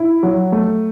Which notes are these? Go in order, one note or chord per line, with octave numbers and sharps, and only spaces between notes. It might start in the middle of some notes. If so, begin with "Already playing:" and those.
Already playing: E4
F#3
A3